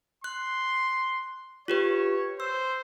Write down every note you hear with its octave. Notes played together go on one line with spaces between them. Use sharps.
C6 F#6
F4 G4 B4 C#5
C5 E6